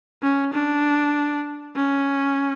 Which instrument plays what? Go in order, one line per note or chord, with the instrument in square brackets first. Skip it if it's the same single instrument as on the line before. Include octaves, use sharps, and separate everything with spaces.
[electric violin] C#4
D4
C#4